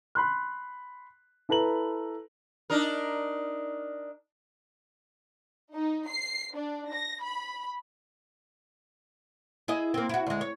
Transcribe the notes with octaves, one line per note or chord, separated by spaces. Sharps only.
B5 C6 F#6
E4 A4 B4 A#5 F#7
D4 D#4 A#4
D#4
C7
D4
A#6
B5
E4 G#4 D#5
A#3 C4
E4 F#4
D2 G#3
C#5